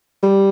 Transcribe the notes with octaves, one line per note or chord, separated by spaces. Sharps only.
G3